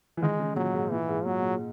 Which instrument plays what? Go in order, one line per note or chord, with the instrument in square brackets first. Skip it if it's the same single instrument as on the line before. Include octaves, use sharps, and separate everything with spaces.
[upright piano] E3
[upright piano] D#3 [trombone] G#3
[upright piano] C#3
[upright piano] A#2 [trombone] F#3
[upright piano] G#2
[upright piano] A#2 [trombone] E3
[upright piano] G#2
[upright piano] A#2 [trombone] F#3
[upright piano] A#2